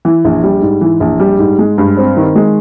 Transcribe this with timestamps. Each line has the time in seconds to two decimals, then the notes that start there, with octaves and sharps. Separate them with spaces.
0.05 E3
0.25 A#1
0.43 G3
0.62 G#2
0.81 E3
1.00 A#1
1.20 G3
1.39 G#2
1.58 G#3
1.78 G2
1.97 C4
2.17 D#3
2.35 G#3